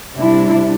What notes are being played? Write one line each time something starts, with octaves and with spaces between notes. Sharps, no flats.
C3 G3 D4 E4